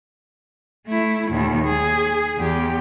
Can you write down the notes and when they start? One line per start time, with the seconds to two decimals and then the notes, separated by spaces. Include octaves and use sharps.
0.87 A3 E4
1.30 D#2 A#2
1.64 G#4
2.38 E2 G4